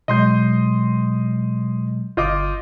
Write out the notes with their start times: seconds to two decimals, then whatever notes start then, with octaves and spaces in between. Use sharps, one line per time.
0.08 B2 F#3 G#3 D#5 C6 G6
2.17 G1 F4 D#5 D6 G6